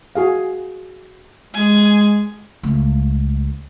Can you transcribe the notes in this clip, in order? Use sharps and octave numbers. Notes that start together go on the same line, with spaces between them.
F#4 G#4 F5
G#3 G#4 G#5
C#2 A3